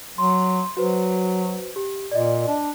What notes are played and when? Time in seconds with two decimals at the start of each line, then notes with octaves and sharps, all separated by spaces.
0.18 F#3 C6
0.77 F#3 F#4 B4 C5
1.76 G4
2.11 A#2 D5 D#5
2.48 D4